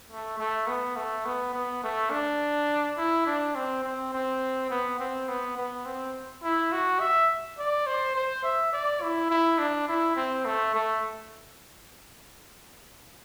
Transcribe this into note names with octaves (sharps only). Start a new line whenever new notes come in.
A3
A3
B3
A3
B3
B3
A3
D4
E4
D4
C4
C4
C4
B3
C4
B3
B3
C4
E4
F#4
E5
D5
C5
C5
E5
D5
E4
E4
D4
E4
C4
A3
A3